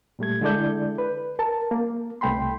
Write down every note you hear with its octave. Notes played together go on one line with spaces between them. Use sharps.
A#2 G3 A3 G#6
D3 G#3 E4 A4 D5 G6
B4
A#4 A5
A#3
C2 A3 G5 B5 C6